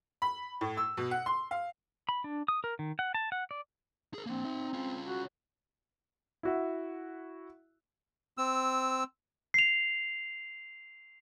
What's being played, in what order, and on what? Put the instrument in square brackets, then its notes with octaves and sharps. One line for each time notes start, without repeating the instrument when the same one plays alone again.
[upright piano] B5
A2
E6
B2
F#5
C6
F5
[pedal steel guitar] B5
D4
D#6
A#4
D#3
F#5
A5
F#5
D5
[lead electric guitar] G#4 A#4
[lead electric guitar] A#3 D4 [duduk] C4
[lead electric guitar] D#4 E5
C#4 F4
[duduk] F#4
[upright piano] E4 F#4 E5
[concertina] C4 E6
[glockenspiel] C7 F7